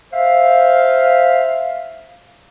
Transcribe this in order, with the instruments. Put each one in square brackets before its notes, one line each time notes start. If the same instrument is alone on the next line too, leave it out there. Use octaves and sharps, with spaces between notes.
[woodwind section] C5 E5 F5